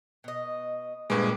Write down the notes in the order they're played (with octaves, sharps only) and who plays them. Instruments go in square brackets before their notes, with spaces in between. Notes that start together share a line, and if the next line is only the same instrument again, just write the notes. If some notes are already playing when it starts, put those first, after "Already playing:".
[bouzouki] B2 D#5
[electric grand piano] G2 G#3 [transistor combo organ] A#2 B4 D6 [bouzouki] C4 G#4